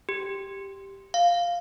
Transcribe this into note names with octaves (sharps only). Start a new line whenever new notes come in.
G4
F5